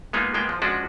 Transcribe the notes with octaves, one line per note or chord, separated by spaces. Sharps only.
G#3 A#3 B3 D#4 F4
G#3 A#3 B3 G5
F3
F3 G#3 C#4 D4 F#4